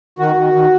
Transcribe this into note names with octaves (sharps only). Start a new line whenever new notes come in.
D#3 F#4
D#3
D#3